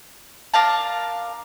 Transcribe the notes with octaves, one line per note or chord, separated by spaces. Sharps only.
D4 A#4 F5 A5